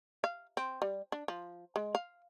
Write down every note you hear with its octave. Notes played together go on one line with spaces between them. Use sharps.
F5
C4
G3
D4
F3
G#3
F5